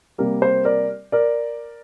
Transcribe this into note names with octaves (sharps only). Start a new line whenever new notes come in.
C3 G3 A#3 A#4
C5
A#4 D5
A#4 D5